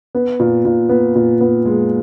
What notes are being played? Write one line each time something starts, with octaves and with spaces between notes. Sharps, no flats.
B3
A#2
A#2
B3
A#2
B3
G#3